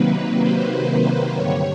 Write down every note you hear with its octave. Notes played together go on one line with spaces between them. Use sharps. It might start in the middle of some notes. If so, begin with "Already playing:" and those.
Already playing: C3 D#3 F#3 A#3 B4
C5
C5
G2 D3 G3 C#5